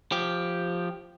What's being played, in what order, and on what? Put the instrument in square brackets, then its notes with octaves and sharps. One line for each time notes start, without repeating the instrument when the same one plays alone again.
[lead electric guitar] F3 G4